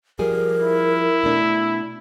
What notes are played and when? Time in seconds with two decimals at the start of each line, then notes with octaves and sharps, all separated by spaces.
0.19 F3 G3 G#4 A#4
0.61 E4
1.23 B2 A3 D4